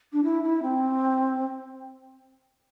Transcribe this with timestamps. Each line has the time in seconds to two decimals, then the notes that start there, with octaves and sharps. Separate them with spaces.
0.12 D4
0.23 E4
0.43 E4
0.62 C4